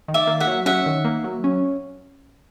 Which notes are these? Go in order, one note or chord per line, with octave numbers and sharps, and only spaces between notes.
D#3
D5 E5
A#3
E5 F#5
F#3
C#4 E5 F#5
D#3
A#3
F#3
C#4